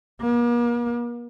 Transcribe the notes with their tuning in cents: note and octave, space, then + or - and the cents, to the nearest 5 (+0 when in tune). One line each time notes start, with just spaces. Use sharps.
A#3 +40